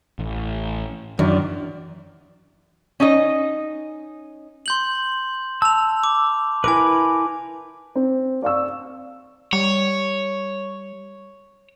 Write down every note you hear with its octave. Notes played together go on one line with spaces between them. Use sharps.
A1
F#2 D#3 E3 D4 D5
C#4 D#4 D#5
C6 G6 F#7
A5 E6 F7
D6
E4 A#4 B4 G#5 D6
C4
D5 F5 C#6 E6
G3 C#5